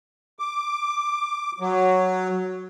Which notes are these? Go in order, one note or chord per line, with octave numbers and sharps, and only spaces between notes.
D6
F#3